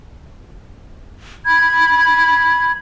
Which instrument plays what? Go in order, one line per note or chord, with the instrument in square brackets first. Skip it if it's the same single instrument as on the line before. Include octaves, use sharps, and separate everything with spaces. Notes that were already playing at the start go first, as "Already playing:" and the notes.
[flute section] B5 G#6